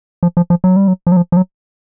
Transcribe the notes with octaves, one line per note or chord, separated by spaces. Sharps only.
F3
F3
F3
F#3
G3
F#3
F3
F#3
F3
F3
F#3